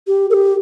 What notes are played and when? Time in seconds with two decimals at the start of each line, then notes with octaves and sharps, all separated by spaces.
0.07 G4
0.30 A#4
0.33 G4